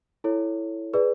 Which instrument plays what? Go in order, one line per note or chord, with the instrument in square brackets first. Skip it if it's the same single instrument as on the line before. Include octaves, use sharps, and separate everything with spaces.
[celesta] E4 A4 C#5
G#4 B4 D5